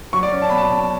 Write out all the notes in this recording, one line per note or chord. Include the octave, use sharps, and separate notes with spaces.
F#3 C#6
D5
C#4
A5
B2 B5
A5
B2